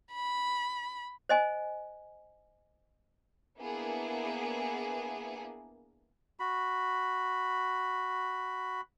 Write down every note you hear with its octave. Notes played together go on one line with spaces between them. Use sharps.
B5
C5 D#5 G#5
A#3 B3 D4 E4 G#4
F#4 B5